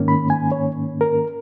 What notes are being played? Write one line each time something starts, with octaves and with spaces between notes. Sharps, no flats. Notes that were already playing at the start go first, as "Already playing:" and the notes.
Already playing: G#2 D#3 A#3 C#4
B5
G#5
C#5
A#4